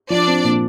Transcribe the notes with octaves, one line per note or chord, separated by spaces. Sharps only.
F3 D4 D5
C4
A#2